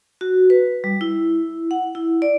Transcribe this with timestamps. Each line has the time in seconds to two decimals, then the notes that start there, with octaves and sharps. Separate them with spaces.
0.21 F#4
0.50 B4
0.84 G3
1.01 E4
1.71 F#5
1.95 E4
2.22 D5